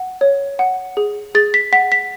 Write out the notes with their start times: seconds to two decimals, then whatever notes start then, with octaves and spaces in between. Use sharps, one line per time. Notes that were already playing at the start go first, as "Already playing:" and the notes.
Already playing: F#5
0.21 C#5
0.59 F#5
0.97 G#4
1.35 G#4 A6
1.54 B6
1.73 F#5 B6
1.92 B6